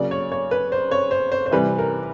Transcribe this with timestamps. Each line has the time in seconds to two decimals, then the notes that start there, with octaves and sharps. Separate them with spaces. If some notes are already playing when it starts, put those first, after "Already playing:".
Already playing: C#3 F#3 A#3 D5
0.11 C#5
0.32 C#5
0.51 B4
0.72 C5
0.91 C#5
1.11 C5
1.32 C5
1.46 C5
1.51 C3 E3 G3 B4
1.78 A#4